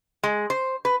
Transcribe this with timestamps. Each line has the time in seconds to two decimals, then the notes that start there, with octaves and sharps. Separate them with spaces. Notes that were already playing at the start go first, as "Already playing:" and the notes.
0.23 G#3
0.50 C5
0.85 B4